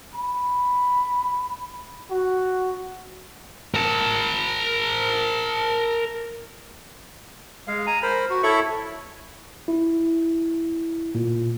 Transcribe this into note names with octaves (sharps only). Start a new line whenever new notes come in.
B5
F#4
A#4 A5
G#3 F5
G#5 A#5
A#4 C5 B5
F#4
E4 A4 C#5 E5 B5 C#6
E4
A#2